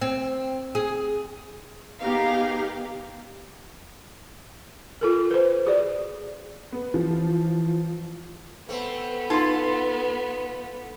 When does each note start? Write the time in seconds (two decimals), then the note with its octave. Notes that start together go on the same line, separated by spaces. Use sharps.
0.01 C4
0.75 G#4
2.02 B3 D#4 G4 G#4 A#4 F5
5.01 F4 A4 A#4
5.31 B4 C5
5.65 F#4 G#4 D5
6.72 B3
6.94 E3 F3
8.69 A3 B3 C4
9.30 D#4 F4 A4 C6